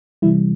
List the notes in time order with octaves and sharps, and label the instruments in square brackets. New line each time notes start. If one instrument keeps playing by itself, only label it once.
[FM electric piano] C3 E3 G3 E4